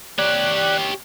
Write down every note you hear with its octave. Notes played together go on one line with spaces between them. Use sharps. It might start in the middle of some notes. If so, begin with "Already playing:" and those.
G4 C#5 D5 F#6